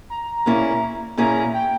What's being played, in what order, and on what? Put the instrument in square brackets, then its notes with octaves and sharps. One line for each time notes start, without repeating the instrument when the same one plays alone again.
[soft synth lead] A#5
[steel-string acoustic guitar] A#2 A#3 C#4 E4 G#4
[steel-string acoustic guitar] A#2 A#3 C#4 E4 G#4 [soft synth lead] A#5
[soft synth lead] G5